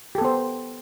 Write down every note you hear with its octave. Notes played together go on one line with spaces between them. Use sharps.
B3 G4 A4 C5